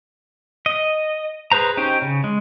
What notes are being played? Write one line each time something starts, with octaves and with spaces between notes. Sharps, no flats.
D#5
G#4 B4 C5 A#5
C#4 D#4 G4 C5 G5
C#3
G#3